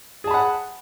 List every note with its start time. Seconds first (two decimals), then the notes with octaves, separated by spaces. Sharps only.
0.24 G#4
0.27 A5
0.31 B5
0.34 F#5